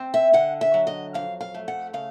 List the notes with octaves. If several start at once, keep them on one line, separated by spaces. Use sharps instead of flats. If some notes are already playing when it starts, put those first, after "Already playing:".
Already playing: C4
E5
D3 F#5
E5
F#3
D#5
F2 F5
F5
A3
F#5
C#3 F5